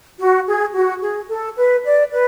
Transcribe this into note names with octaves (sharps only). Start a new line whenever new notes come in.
F#4
G#4
F#4
G#4
A4
B4
D5
B4